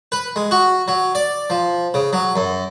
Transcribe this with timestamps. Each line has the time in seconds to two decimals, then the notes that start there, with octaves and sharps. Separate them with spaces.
0.12 B4
0.36 G#3
0.51 F#4
0.88 F#3
1.15 D5
1.50 F3
1.94 C#3
2.13 F#3
2.36 F#2